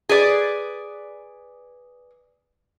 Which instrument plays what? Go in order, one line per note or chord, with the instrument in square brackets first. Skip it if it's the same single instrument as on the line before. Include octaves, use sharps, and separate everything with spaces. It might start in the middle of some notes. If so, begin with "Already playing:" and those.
[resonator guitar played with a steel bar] G#4 B4 D5